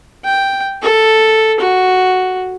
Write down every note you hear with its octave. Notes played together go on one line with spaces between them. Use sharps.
G5
A4
F#4